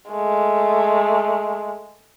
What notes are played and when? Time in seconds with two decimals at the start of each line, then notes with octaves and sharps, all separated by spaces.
0.11 G#3 A3